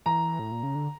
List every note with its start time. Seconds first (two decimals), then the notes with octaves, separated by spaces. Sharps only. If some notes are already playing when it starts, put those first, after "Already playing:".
0.06 E3 A#5
0.39 A2
0.51 A#2
0.63 C#3
0.75 D3